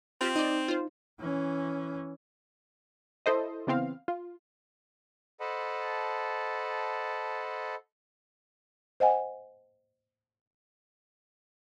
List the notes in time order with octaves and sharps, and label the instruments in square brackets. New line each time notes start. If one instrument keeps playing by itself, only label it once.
[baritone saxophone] C4 [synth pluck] F4 G4 C5
[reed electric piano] D#4 [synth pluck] D5 D#5
[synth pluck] F4 C5
[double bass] E3 C#4
[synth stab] E4 A4 C5 D#5
C#3 E3 B3 C4 F5
F4
[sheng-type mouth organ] A4 C5 D#5 F#5 A5 B5
[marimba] C5 D#5 F#5 G#5